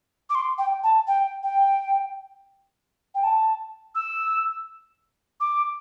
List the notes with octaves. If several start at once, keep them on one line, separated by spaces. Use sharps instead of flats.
D6
C6
G5
A5
G5
G5
G5
A5
E6
D6